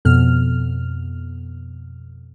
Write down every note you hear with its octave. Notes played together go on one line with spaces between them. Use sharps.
F2 B2 F6